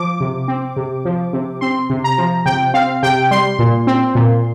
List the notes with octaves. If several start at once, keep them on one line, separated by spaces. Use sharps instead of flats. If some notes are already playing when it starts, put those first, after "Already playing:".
Already playing: F3 D6
C3
C4
C3
F3
C3
C4 C6
C3
A#5
F3
C3 G5
C4 F5
C3 G5
G3 C6
A#2
C4
A#2